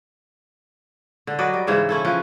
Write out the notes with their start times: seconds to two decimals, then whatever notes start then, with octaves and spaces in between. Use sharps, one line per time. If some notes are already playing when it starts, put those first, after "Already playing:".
1.27 D3
1.39 F#3 B4 D5 D#5
1.53 G3
1.67 G#2 C#3 E3 C5
1.89 C#4 E4 A4
2.05 F3 C#4 B4